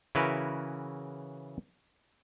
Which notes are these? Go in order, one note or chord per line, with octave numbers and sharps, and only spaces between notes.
C#3 E3 E4 F#4 A#4 B4